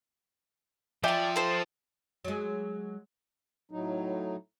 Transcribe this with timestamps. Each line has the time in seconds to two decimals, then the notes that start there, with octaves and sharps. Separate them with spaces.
1.04 F3 D5 E5 G5 A5
1.36 A4 C5
2.25 F#3 G#3
3.71 A2 F#3 D#4